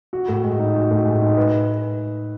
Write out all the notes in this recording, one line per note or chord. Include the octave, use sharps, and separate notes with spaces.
F#4
A2
G#3
D#4
F#4
A2
G#3
D#4
B4